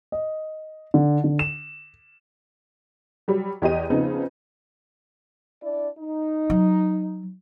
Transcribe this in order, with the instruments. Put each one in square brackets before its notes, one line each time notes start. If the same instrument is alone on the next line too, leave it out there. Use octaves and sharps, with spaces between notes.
[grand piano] D#5
D3
D3
E7
[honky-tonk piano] F#3 G3
E2 G4 D#5 D#7
C#3 F3 B3 C4 D#4
[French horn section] D4 E4 D5
D#4
[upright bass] F#3